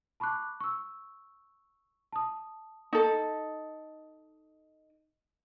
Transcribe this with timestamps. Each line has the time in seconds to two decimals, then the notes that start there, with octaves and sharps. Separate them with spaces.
0.20 A5 B5 C#6 D6 F#6
0.60 C#6 E6
2.12 A5 D#6
2.93 D#4 A4